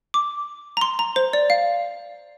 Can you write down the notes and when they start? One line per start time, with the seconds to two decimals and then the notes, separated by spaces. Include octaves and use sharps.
0.14 D6
0.77 A#5
0.81 C6
0.99 A#5
1.16 C5
1.33 D5
1.50 F5